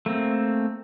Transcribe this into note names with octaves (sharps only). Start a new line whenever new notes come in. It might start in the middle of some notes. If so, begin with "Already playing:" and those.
A3 A#3 C4